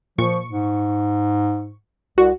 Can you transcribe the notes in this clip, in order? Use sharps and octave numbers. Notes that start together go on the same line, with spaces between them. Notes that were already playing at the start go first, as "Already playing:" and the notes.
A#2 F3 C#6
G#2
C2 F#4